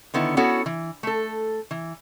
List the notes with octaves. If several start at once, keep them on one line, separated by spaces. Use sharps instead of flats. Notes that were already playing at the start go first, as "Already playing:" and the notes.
D3 D#3 B3 E4
B3 C#4 E4 F#4 A4 C#5
E3
A3 A4
E3